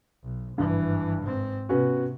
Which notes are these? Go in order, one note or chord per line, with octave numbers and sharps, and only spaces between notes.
B1
G#1 G2 E3
G#2 C4
C3 B3 C#4 F#4